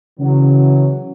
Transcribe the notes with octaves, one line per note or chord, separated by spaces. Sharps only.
C#3 E3 F#3